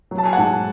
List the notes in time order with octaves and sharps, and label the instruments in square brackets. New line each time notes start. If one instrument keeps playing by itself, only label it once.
[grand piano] F#3
A5
G#5
G#2 F#5 A5